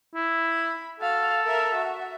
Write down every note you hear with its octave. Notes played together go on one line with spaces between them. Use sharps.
E4
B5
F#4 A4 F5
A#4 E5
F#4 E5